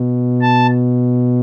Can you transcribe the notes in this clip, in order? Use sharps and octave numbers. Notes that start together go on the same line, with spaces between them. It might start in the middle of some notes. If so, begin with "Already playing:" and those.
Already playing: B2
A5